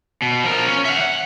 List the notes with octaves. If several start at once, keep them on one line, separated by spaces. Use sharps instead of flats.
B2
F3 A#4
C#4
E5 F#5
F#5